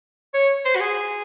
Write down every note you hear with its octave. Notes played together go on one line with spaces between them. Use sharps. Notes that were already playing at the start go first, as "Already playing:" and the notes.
C#5
C5
F#4
G#4